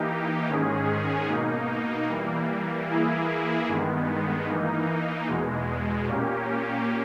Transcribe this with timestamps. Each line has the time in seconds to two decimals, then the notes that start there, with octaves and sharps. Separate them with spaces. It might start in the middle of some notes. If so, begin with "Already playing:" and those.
Already playing: E3 A#3 D#4 G4
0.49 G#2 D#3 G#3 C#4 G#4
1.28 B2 A#3 D#4
2.08 E3 G3 A#3
2.88 E3 A#3 E4 G#4
3.68 G2 D#3 G#3 B3
4.47 E3 A#3 D#4
5.27 E2 B2 G#3
6.07 A#2 A#3 C#4 G4